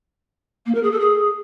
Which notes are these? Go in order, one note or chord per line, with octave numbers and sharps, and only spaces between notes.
A#3
A#4
G#4
A4
G#4